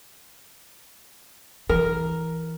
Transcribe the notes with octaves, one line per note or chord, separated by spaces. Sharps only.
E3 A#4